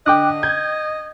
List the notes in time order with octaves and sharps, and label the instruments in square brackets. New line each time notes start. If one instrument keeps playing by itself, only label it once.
[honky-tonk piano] D3 [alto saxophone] D#5 [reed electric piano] G5 D6 F#6
[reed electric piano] G6 [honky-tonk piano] G#6